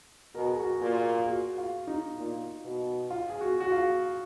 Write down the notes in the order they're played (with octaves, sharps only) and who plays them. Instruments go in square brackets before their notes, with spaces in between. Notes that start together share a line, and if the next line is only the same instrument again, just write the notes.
[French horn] B2 [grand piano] A#4
[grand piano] G#4
F#4
G#4
[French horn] A#2
[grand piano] G#4
F#4
F4
D#4
[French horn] A#2
B2
[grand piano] F4
G#4
F#4
F#4
F4